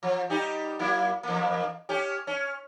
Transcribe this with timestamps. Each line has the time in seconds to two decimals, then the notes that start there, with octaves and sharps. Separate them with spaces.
0.03 F3
0.30 G3 D#4 G4
0.79 F#3 A#3 E4
1.23 E2 A#3
1.89 C#4 G4
2.27 C#4